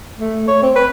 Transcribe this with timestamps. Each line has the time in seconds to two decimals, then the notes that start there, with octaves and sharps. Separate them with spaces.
0.19 A3
0.48 C#5
0.62 C4
0.76 B4